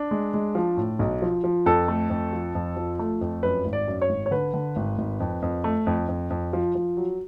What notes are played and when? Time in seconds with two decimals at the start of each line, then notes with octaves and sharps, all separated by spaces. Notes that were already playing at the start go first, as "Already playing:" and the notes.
Already playing: D4
0.11 G#3
0.34 G#3
0.55 F3
0.77 A2
0.99 B1
1.22 F3
1.44 F3
1.66 F2 A4
1.88 A3
2.10 F2
2.33 F3
2.55 F2
2.76 F3
2.99 A3
3.21 F2
3.43 F#2 B4
3.65 G#1
3.73 D5
3.88 F#2
4.02 C#5
4.09 G#1
4.26 C#5
4.31 D3 B4
4.54 D3
4.76 G#1
4.98 G#1
5.20 F2
5.42 F2
5.64 A3
5.87 F2
6.08 F2
6.30 F2
6.53 F3
6.75 F3
6.97 F#3